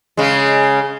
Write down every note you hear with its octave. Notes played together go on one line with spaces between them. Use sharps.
C#3 G#3